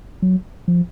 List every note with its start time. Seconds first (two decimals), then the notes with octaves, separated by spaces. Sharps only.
0.22 F#3
0.68 F3